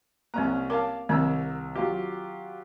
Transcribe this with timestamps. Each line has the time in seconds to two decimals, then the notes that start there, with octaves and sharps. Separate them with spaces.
0.34 C2 A#3 C4 C#4 A#5
0.70 A#4 C#5 F5 A5 D6
1.09 C2 D#3 C4 A#5 E6
1.76 F#3 F4 G4